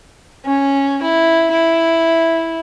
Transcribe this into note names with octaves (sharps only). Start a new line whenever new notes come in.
C#4
E4
E4